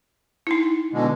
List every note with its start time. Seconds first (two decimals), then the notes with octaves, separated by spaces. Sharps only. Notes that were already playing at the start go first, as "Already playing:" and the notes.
0.47 D#4 E4
0.93 B2 D3 G#3